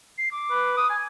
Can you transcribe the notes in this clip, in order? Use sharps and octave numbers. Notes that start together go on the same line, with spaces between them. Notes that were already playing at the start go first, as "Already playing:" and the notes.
C7
D6
B4
D#6
G#5